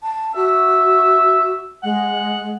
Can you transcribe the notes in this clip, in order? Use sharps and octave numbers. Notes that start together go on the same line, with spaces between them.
A5
F#4 E5
G#3 F#5